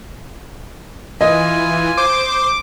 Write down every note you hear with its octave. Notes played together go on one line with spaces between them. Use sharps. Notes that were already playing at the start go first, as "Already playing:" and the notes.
E3 F4 D#5 G#5
C5 D6